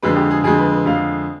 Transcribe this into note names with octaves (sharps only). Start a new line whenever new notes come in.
F2 D3 G#3 B4
G4
G#4
F2 D3 G#3 G#4
B4
B4
F2 D3 G#3 F5